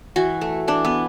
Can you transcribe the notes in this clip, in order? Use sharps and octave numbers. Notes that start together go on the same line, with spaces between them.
E3 F#4
A3
E3 D4
B3